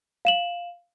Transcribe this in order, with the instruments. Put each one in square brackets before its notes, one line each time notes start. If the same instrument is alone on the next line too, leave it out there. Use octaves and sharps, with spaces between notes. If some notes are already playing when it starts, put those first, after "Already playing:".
[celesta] F5 E7 F#7